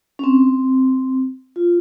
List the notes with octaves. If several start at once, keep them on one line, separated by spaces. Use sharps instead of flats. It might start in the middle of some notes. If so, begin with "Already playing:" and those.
C#4
C4
F4